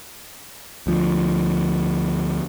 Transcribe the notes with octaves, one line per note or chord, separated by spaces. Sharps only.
D2 F3